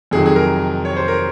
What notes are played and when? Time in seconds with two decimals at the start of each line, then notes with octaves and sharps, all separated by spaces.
0.11 F2 C3 D#3 F#3 G#4
0.26 G#4
0.36 A#4
0.85 C#5
0.96 C5
1.08 A#4